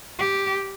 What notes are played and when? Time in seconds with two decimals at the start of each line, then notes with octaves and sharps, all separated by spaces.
0.19 G4